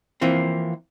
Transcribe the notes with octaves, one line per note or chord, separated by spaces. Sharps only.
E3 F3 A#3 C4